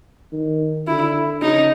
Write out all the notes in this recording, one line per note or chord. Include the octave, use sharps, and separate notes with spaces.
D#3
D3 E4
C#3 D#4